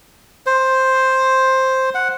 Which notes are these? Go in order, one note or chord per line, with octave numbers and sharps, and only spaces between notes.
C5
F#5